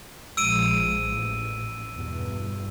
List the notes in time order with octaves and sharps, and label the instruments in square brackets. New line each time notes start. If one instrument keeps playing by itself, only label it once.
[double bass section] A#1 F3 G#3 [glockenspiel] E6 D7 D#7
[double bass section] A1
E2 G2 B2